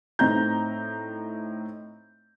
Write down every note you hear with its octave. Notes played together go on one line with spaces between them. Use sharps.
A2 C4 D#4 A#5 G6